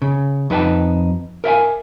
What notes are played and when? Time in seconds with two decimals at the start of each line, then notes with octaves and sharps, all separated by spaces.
0.02 C#3
0.50 F2 D#4 B4 G5 A5
1.44 A#4 E5 F5 G#5